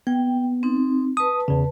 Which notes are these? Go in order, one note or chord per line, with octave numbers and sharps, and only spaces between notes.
B3 G5
C4 D#4
B4 A5 D#6
E2 C#3